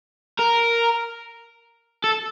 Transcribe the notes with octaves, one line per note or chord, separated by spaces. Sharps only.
A#4
A4